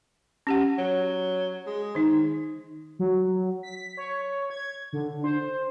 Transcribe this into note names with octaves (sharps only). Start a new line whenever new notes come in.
C#4 G4 F#5
F#3
G#3
D#3 D#4
F#3
B6
C#5
G#6
D3
C5